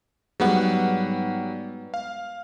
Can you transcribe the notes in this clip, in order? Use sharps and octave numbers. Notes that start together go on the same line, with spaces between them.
G#2 F#3 G3 B3 F#5
F5